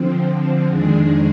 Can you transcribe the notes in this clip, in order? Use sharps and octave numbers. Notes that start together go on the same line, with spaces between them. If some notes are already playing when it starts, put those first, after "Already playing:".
Already playing: D3 F3 C4
F2 D#3 G#3 D4 G#4